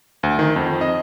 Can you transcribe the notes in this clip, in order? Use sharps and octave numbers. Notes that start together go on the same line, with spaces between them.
D2
D#3
F2
D#5